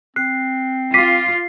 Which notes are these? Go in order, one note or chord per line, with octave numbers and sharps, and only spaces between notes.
C4 F#6 C7
F4 D6 B6 C7 D#7